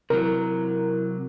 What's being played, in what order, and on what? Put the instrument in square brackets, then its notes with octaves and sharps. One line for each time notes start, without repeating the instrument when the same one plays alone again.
[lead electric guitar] C3 F#3 [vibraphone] E4 [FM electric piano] A#4